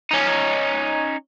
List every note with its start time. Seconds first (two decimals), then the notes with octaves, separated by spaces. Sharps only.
0.11 C#4 D#4